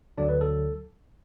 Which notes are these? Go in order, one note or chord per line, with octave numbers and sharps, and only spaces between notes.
D2 D3 F#3 D4 D5
B4
A4